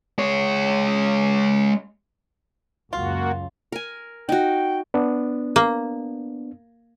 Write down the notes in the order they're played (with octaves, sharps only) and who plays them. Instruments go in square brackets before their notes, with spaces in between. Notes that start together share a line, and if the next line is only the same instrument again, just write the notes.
[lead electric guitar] G#3 C#5
[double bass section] C#2 F#2 [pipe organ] A#3 F#4 [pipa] F4
[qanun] A#4 G#5
[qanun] D#4 F#4 [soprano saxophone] G5
[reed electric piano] B3 D4
[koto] A#3